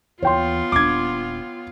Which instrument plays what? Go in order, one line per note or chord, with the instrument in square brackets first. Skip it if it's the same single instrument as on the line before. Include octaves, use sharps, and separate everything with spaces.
[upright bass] D#2 E3 [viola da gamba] B3 F4 [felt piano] C#5 G5 C6
[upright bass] D#1 D4 [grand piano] D6 G#6